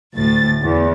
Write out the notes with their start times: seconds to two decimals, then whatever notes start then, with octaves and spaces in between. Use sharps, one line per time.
0.15 D2 A2 A6
0.61 E2